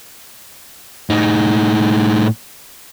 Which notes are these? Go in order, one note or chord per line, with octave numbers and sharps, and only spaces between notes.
A2 D#4